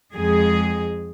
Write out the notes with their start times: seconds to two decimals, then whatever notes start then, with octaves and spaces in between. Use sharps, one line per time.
0.12 F2 G#3 G#4